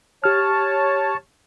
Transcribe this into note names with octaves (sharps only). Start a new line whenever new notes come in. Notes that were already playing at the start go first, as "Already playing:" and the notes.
G4 C#5 A5 F6